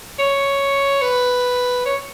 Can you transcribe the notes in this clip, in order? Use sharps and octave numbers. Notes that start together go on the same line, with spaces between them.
C#5
B4
C#5